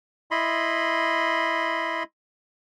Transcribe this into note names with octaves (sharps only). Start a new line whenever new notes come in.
E4 D#5 B5 C6